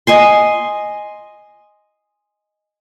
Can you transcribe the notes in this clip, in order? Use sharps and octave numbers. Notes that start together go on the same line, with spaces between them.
D#5 G#5 C6